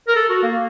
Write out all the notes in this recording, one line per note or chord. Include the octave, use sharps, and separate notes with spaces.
A#4
A4
F#4
A#3